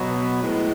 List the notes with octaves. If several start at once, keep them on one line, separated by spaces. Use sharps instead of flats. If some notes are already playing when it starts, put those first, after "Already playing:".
Already playing: B2 F#3 B3
A2 G#3 B3